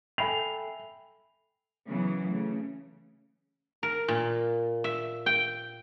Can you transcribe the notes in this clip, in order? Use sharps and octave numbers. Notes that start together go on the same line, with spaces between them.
A4 E5 G5 G#5 B5 C7 F7
C#3 E3 F#3 B3
C#3 A3
A#4
A#2
E5
G5